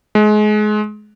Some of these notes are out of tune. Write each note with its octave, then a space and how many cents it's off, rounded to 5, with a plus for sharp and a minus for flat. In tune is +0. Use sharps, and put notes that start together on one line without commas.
G#3 +30